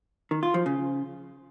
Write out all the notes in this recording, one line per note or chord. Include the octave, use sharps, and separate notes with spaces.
D#3
F4
F3
C#3